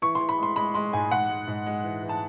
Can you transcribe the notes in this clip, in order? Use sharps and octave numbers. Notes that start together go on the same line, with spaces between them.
E3 C#6
E3 C6
B5
G#3 C6
G#3 B5
G#3 C6
G#2 G#5
G#2 F#5
G#3
G#2
G#3
E3
E3
A5